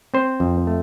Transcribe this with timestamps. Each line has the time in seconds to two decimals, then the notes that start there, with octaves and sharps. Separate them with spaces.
0.14 C4 C5
0.40 F2
0.67 A3